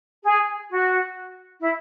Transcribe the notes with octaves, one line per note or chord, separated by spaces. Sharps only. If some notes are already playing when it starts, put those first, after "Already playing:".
G#4
F#4
E4